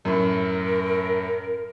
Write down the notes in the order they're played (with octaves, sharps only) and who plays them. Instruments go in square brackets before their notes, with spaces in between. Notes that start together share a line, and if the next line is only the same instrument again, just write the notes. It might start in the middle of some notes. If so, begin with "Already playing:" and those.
[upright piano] F#2 A2 [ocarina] A#4